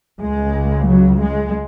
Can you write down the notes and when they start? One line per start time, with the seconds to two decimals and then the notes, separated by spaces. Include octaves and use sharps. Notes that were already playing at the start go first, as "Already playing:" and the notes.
0.22 C#2 C#3 G#3
0.88 F#3
1.21 G#3